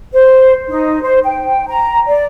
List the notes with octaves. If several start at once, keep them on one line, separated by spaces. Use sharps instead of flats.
C5
D#4
C5
G5
A#5
D5